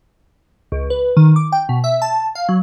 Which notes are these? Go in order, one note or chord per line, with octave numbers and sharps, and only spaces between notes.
C#2
B4
D#3
D6
G5
B2
E5
A5
F5
F#3